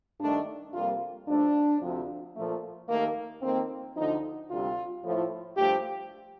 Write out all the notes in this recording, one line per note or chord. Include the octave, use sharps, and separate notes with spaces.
G2 D#3 A3 D4
F2 C3 G3 A#3 F4
G2 F3 A3 D4
D2 C3 F3
A#2 F3 A3
D#2 D#3 A3 A#3
F2 D#3 A#3 C4
D2 D3 F3 D#4
D2 C3 G3 F4
A2 F3 A3
G2 F3 A3 G4